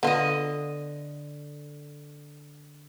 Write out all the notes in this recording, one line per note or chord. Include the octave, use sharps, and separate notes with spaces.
D3 B3 F4 D#5